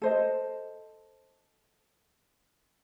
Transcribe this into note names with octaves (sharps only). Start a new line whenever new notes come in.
A4 C5 D#5